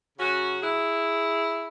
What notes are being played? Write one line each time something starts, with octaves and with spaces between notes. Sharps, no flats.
C#3 F#3 C#4 F#4
E4 G#4